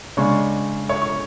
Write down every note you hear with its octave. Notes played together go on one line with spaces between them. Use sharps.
C#3 G#3 D4 C#5 C#6
C#5 C#6
C#6